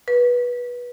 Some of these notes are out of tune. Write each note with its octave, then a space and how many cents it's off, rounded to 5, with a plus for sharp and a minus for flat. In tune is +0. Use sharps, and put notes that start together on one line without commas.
B4 -20